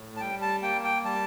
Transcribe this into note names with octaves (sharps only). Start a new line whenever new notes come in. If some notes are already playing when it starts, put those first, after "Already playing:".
Already playing: A2
A5
G3 G5
A5
A#3 G5
G5
G3 A5